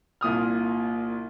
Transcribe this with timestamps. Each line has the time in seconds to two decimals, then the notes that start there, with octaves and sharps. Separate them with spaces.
0.21 C2 A#2 D#6 F6